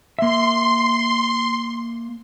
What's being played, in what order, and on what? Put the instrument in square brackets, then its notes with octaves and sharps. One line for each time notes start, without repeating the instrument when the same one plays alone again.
[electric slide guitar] A#3 E5 [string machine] C6